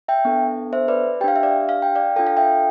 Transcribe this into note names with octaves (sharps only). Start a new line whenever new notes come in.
E5 G5
B3 D4 A4
C5 E5
B4 D5
D4 G4 F5 G5
E5
D5 F5
F5
G5
D5 F5
D4 F4 A4 G5
F5
E5 G5